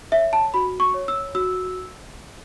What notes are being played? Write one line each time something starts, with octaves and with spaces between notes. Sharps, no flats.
C#5 E5
A5
F#4 B5
C#6
C#5
E6
F#4 E6